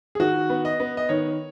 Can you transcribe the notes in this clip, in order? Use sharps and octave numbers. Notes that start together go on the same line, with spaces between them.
G#4
D#3 F#4
B3
D#5
B3
D#5
D#3 C#5